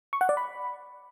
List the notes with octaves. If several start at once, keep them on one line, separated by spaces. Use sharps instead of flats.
C#6
F#5
D5
B5